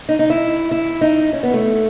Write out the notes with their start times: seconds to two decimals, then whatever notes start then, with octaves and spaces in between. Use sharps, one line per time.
0.09 D#4
0.19 D#4
0.30 E4
0.71 E4
1.01 D#4
1.33 C#4
1.43 B3
1.54 A3